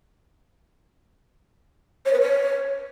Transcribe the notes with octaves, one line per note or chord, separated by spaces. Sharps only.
C#5
B4
C#5